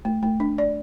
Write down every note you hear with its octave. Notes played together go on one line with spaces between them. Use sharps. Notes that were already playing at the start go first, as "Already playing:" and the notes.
A3
A3
D4
D5